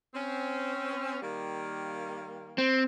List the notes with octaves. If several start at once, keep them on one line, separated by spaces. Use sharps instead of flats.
C4 C#4
D#3 G3 A#3
C4